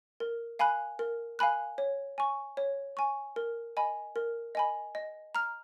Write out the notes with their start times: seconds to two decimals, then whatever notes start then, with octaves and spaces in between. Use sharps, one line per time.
0.20 A#4
0.59 F5 G#5 B5 F#6
0.99 A#4
1.39 F5 G#5 B5 F#6
1.78 C#5
2.18 G#5 C#6
2.57 C#5
2.97 G#5 C#6
3.36 A#4
3.77 D#5 G#5 B5
4.16 A#4
4.55 D#5 G#5 B5
4.95 D#5
5.35 A#5 F6